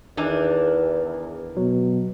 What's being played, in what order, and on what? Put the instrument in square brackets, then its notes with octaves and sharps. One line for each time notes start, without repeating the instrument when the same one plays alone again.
[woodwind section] E2 [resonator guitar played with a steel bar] D#3 E3 D4
[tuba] B2 [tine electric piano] F#3